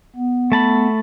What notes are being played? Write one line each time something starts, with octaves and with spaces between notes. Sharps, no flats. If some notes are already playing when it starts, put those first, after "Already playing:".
B3
A3 A5 B5